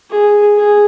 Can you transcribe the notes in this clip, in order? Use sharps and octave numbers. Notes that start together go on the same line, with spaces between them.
G#4
G#4